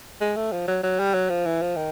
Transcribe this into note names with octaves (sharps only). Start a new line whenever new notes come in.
G#3
A3
F3
F#3
F#3
G3
F#3
F3
E3
F3
D#3